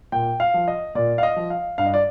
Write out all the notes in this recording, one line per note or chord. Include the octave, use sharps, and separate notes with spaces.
A#2 G5
F5
F3
D#5
A#2 D5
F5
D#5
F3
F5
G2 F5
D#5
D5